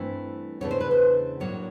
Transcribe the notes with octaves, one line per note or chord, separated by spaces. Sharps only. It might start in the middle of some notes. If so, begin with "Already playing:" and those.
Already playing: G2 E3 A3 C4 E4
E2 C#3 E3 A3 D4 C#5
C5
B4
C5
A2 F#3 A#3 D4 C#5